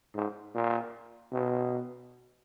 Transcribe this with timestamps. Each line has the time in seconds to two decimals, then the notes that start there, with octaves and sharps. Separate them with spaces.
0.15 G#2
0.55 A#2
1.32 B2